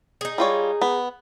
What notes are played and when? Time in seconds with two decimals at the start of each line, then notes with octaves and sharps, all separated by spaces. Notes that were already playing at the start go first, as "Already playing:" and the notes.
0.21 D#4 G#4
0.38 G3 F4 C#5
0.82 B3